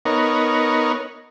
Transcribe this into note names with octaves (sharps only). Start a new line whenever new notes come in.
B3 D#4 A#4 C#5